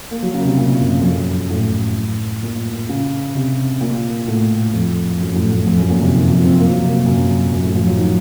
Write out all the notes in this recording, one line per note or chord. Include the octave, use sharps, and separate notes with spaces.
A#3
F#3
C#3
C3
A#2
F#2
F2
F#2
A2
A#2
C#3
C3
A#2
A2
F2
F#2
A2
A2
F2
F#2
A#2
C3
D#3
F3
C4
A#3
F#3
C3
A#2
F#2
F#2
A2
F3
F#3
D#3